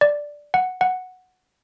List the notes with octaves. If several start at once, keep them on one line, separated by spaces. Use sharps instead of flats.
D5
F#5
F#5